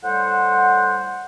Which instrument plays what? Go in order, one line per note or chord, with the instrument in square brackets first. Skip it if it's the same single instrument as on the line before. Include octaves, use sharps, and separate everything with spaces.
[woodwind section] A2 G3 C5 F#5